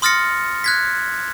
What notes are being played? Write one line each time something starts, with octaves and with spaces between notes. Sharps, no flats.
C6 D#6 F6 A6 A#6 C#7
F#6 G#6 B6